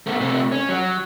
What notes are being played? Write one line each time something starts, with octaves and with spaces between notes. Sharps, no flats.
A3 B3
C3 A3
C#4
F#3